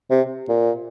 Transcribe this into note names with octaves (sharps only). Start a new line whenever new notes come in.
C3
A#2